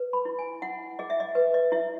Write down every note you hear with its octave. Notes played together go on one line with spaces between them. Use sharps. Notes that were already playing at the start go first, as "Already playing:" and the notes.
Already playing: B4
B5
E4
G#5
E4 F#5
G#4 D#5
E5
D#5
B4
D#5
E4 E5